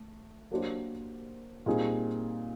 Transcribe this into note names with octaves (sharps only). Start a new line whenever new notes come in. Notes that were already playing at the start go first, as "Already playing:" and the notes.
Already playing: A3
F#3 A#3 D4 G4 C5
A#2 G3 C4 D#4 G#4